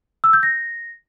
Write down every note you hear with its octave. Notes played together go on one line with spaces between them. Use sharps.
E6
G6
A#6